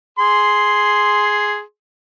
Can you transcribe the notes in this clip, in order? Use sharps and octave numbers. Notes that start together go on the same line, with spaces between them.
G#4 C6